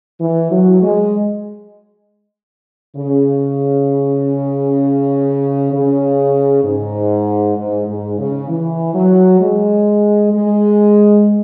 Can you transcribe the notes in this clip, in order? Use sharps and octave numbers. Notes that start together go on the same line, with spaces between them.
E3
F#3
G#3
C#3
C#3
G#2
G#2
G#2
C#3
E3
F#3
G#3
G#3